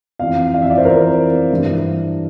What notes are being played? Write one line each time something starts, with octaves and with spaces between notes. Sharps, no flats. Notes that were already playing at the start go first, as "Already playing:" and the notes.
F2 E3 F5
F5
E5
D5
C5
F2 E3 A#4
G2 E3